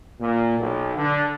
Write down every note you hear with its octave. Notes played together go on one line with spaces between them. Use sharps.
A#2
B1
D3